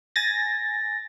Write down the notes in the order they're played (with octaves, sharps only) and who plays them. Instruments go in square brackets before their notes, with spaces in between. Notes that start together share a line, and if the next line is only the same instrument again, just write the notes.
[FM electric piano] G#5 A6 A#6